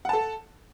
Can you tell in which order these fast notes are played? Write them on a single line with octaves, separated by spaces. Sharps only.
F#5 A5 A4